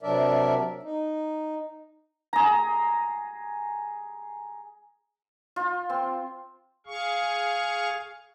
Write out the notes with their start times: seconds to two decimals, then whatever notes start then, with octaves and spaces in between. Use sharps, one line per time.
0.02 C3 F#3 D4 A#4 D5 E5
0.83 D#4
2.33 G#4 A#5
5.56 F4
5.90 C4
6.86 G#4 F5 C#6